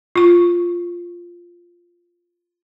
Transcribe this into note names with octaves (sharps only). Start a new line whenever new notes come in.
F4 C#6